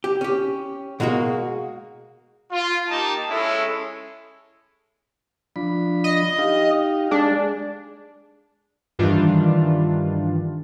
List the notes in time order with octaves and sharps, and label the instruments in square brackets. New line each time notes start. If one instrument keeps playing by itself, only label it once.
[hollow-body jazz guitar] G4
C#4 G4
B2 G#3 A#3 F#4 G#4
[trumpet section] F4
A#3 D#4 G4 A5
G#3 C#4 E4 A4
[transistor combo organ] F3 D4 B5
[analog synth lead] D#5
[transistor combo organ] D#4 G4 F5
[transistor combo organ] G#3 G#4 [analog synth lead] D4
[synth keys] G2 D#3 E3 G3 D4 F4